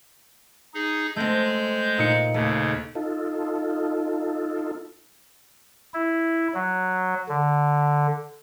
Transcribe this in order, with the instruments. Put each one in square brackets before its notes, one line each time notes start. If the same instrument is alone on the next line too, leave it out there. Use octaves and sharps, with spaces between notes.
[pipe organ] D#4 G#4
[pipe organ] G#3 G6 [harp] A3 C4
[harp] A#2 D#4 C#7
[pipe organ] D#2 C#3 [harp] A3
[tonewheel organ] D#4 F4 A4
[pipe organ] E4
F#3
D3